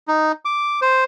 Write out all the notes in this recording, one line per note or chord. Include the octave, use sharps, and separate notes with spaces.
D#4
D6
C5